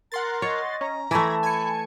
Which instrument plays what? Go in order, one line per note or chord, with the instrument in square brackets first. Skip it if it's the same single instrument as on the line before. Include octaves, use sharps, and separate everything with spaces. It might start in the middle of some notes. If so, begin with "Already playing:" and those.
[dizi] A#4 [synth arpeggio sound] F#5 C6 A6 [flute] A#5
[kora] C#5 [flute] D#5
[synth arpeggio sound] C#4 [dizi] A#5
[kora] E3 A3 [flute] A5 [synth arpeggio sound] B5 G#6 A#6
[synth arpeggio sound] G#5 G#6 C#7 [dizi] B5